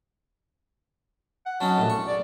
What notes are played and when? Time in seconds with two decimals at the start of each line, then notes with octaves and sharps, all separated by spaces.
1.46 F#5
1.60 F#3 C#4 D#4 A5
1.78 A#1 A2
1.90 C#6
2.08 D5